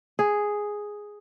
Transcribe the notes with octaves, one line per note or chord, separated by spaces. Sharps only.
G#4